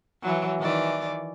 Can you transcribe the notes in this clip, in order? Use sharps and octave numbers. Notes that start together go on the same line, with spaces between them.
E3 F#3
D#3 E3 D5